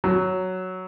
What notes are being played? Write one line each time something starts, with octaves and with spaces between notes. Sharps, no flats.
F#3